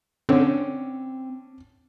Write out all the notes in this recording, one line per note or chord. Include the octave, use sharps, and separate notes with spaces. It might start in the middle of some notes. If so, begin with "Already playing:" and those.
D3 C4 C#4